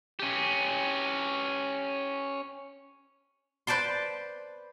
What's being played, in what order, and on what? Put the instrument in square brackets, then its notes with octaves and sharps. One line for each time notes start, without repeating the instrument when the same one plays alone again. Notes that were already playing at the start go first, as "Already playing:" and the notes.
[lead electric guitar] C#4 G4
[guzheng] B4 C5 D5 A5 C6